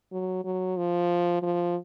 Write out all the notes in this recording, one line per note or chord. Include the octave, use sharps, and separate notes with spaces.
F#3
F#3
F3
F3